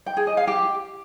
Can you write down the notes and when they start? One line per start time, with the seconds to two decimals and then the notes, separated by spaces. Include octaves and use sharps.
0.06 G5
0.17 G#4
0.27 D#5
0.37 F5
0.47 G4